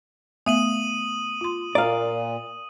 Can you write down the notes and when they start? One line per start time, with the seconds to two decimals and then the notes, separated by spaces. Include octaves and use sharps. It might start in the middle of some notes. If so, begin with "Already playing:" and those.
0.46 A3 B3 E5 D#6 D#7 F#7
1.41 F4 C6
1.75 A#2 D5 F5 A#5